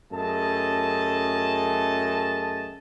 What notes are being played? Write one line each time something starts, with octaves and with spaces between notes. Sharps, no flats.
F#2 A3 G#4 D#5 A5